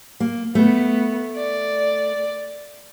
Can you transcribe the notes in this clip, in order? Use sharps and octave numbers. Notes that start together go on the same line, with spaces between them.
A#3
A3 B3
D5